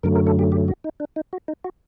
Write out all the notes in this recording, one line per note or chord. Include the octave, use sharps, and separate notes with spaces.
F#2 D3 F#3 A3 A#4
A#4
A4
G4
G4
F#4
D#4
D4
D#4
F#4
D#4
F#4